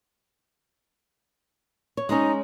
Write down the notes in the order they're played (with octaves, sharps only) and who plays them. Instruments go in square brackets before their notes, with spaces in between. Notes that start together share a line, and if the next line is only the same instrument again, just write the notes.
[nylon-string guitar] C#5
[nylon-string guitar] G#3 C#4 [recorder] D#4